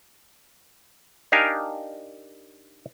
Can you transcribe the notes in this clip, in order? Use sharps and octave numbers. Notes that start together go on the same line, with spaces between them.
D4 D#4 G4 A#4 F5 G#5